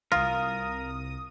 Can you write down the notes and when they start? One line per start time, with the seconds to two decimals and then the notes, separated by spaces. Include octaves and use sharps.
0.12 C2 F4 A#4 D#6